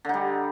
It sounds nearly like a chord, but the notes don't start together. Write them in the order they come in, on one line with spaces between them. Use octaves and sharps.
D3 D#4 G3